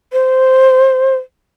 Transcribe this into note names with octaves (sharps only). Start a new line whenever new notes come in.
C5